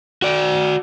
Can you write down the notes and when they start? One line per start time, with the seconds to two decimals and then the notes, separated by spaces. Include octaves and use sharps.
0.22 F#4 D5